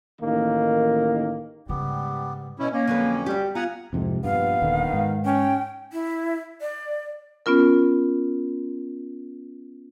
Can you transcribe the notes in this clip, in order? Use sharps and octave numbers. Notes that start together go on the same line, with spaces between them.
A1 D#3 A#3 D#4
G#2 C#3 G3 B3 G4
B2 C#4 E4
A#3 C#4
F2 D3 F#3 C#4 B4
G3 F#4 G4
B3 F4 F#5 G#5 A#5
C2 F2 G#2 C3
A#1 G2 B3 F5
D#1 D3 D#3
G#2
C#4 G5
E4
D5
B3 C#4 F4 A#4